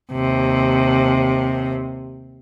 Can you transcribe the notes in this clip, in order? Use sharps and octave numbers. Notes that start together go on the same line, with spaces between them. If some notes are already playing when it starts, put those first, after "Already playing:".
D#2 C3